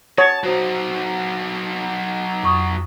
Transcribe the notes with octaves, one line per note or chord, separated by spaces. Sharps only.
C#5 F#5 A5
F#3 D#4 F#4 C5
F2 C#6 D#6